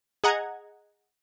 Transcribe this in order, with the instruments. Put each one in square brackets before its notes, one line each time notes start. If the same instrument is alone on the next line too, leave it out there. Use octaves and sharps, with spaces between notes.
[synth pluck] G#4 D#5 F#5 A#5 G#6